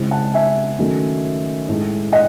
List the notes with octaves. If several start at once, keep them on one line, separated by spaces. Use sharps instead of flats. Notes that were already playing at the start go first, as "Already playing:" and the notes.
Already playing: C#3 G#3 C4 E4
F#5 A5
E5 G#5
D#3 F#3 A3 C#4
A2 G#3 D#4
D#5 F#5